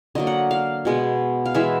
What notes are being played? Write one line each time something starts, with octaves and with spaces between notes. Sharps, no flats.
D3 F#3 A#3 D#5
F#5
F5
B2 G#3 B3
F5
E3 G#3 B3 E5